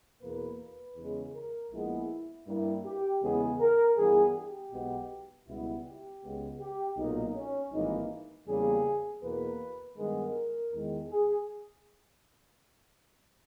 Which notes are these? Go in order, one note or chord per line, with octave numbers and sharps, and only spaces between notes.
E2 B2 A#3 B4
B4
E2 C#3 G#3
A#4
A#1 A#2 G#3 B3 E4
G2 G3 A#3 E4
G4
E2 C#3 G#3 B3 G#4
A#4
G2 E3 G3 B3 G#4
G4
B1 B2 G#3 B3
C#2 B2 G3 B3 E4
G4
C#2 C#3 G#3 B3
G4
B1 A#2 A#3 D#4
C#4
G#1 G2 E3 A#3 D#4
E2 C#3 G3 A#3 G#4
E2 B2 A#3 B4
G2 D#3 G#3 B3 A#4
E2 D#3 G#3
G#4